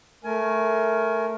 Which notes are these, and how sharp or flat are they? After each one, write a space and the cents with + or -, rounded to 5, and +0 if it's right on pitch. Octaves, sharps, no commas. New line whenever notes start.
A3 +0 A#4 +0 G#5 +25